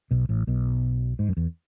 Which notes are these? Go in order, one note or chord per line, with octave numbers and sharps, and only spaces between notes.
B1 B2
A1 A2
B1 B2
G#2
F#2
E2